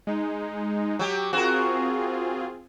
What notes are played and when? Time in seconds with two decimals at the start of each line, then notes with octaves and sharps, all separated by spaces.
0.07 G#3 D#4
0.99 F#3 G4
1.33 C4 F4 F#4 G#4 A#4